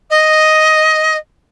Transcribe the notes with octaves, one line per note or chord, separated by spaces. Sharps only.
D#5